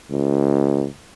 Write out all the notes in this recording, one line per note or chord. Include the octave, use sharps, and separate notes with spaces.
C#2